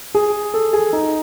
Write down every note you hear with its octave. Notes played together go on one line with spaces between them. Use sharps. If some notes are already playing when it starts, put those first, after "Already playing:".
G#4
A4
G#4
D#4